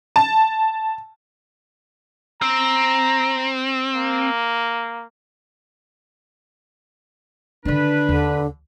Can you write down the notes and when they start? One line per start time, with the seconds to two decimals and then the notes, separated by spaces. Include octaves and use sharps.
0.16 A5
2.42 C4 A#5
3.95 A#3
7.65 D3 D#3 D4 B4
8.09 D#2 D3